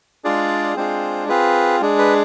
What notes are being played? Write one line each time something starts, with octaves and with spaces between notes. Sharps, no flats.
G#3 D4 F4 G#4 D5
G#3 C4 D4 F4 G#4 C5
C4 F4 G#4 B4
G#3 D4 G#4
B4